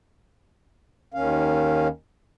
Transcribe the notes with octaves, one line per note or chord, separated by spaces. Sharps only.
D#2 D#3 C#4 F5